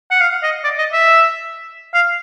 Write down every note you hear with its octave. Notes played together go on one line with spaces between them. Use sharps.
F#5
F5
D#5
D5
D#5
E5
F5